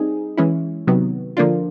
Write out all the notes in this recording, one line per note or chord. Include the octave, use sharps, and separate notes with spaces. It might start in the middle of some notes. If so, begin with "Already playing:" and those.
Already playing: G3 C4 D#4 G#4
E3 G#3 C#4 E4
C3 D#3 F#3 B3
D3 F3 A#3 D4 F4